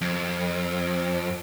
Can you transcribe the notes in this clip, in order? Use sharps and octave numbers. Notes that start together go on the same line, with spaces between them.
F2